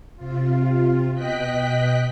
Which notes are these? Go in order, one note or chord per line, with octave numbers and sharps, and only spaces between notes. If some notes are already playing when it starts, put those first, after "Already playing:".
C3 F4
B2 D#5 G5 F#6 B6